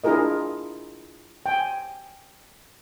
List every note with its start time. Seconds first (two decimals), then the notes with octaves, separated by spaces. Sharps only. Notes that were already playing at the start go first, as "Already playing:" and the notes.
0.04 D4 E4 F4 G#4 A#4 D#5
1.46 G5 G#5